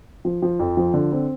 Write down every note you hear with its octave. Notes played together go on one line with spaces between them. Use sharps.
F3
F3
F2
F3
D3
C4